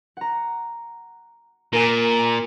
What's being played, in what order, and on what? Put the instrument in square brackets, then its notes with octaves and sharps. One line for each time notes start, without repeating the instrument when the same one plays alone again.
[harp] F#5 A#5
[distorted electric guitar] A#2 [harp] A#4 G#5